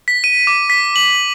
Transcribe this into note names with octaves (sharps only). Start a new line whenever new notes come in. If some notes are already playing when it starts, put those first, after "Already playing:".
B6
D#7
D6
B6
F#7